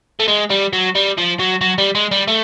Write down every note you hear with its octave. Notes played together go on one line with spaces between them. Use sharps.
A3
G#3
G3
F#3
G3
F3
F#3
F#3
G3
G#3
G3
A3